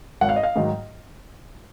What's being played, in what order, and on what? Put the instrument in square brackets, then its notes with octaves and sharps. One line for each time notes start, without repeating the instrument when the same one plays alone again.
[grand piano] G#1 F#5
F5
D#5
F5
G#2 D#3 F#3